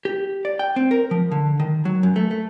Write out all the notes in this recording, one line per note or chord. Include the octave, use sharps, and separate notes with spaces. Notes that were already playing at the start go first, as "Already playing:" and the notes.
G4
D5
G5
C4
A#4
F3
D3
D#3
F#3
F#2
A3
A3